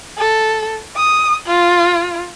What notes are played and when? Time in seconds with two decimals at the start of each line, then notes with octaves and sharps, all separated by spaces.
0.17 A4
0.96 D#6
1.47 F4